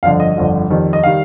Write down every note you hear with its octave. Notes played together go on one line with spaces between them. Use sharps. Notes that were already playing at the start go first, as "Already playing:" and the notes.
G1 F2 D3 F3 F5
D#5
G1 F2 D3 F3
F2 D#3 G3
D#5
D#3 G3 F5